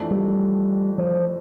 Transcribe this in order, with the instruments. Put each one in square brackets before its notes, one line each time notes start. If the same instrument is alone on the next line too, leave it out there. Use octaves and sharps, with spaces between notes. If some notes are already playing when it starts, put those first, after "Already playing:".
Already playing: [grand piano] F2 E3 A3 D4
[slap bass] G3
F3